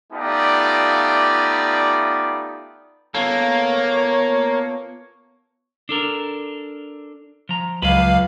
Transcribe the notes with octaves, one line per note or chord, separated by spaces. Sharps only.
A3 B3 D#4 F4 G4 D5
A#3 B3 F4 A4 C#5
D4 A4 A#4
F3 A#5
C#2 F#3 B4 F5 B5